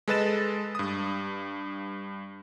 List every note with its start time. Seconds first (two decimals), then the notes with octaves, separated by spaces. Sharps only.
0.08 G#3 A4 B4 D#5 A6 E7
0.75 G2 D#6